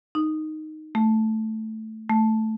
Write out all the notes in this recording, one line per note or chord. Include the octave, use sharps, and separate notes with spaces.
D#4
A3
A3